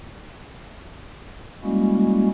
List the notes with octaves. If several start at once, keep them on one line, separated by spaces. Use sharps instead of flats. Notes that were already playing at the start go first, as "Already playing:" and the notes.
G3 G#3 A#3 C#4 E4 F#4